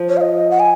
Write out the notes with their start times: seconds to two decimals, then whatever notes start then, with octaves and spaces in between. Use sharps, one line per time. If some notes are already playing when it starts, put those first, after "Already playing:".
Already playing: F3
0.09 C#5
0.17 F5
0.21 D#5
0.51 F#5
0.60 G#5